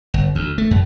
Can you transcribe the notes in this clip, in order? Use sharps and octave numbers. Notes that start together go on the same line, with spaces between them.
G1
D2
A3
F#2